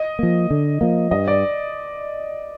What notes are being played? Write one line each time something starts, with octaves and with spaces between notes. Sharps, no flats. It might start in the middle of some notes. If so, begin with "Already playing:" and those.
Already playing: D#5
F3 A#3
D3
F3 A#3
G2 D#5
D5